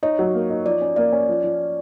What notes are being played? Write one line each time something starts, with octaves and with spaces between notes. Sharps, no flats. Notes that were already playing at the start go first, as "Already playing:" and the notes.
D#4 C#5
F#3
A#3
D#4
F3 D5
C#4
A#3 D5
C#4
F3
F3